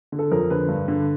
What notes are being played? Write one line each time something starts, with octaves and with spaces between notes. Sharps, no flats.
D3
A4
F2 A#4
D3 B4
G2
D3